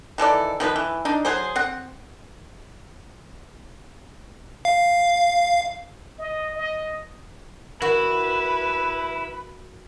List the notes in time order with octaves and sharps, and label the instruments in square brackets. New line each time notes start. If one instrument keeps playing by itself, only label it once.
[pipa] D#3 E3 A4 D5
D#3 F3 C#4 B4
E3
D4 D#4
F#3 G#4 C5
C4 F#5
[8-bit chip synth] F5
[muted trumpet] D#5
D#5
[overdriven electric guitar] E4 [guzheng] F#4 [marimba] A#4 [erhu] B4